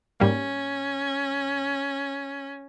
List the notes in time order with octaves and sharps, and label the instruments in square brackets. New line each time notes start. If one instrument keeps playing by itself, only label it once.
[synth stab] G#2 G3 A#3 [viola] C#4